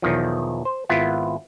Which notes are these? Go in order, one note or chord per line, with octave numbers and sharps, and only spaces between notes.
B1 E2 D#3 F3
C5
G#1 B3 E4 F4